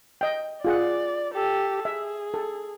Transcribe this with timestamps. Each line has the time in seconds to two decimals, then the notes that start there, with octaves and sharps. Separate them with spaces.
0.21 D#5 G5
0.65 F4 G#4 D5 F#5
1.33 G4 A4
1.85 G#4 E5
2.34 A4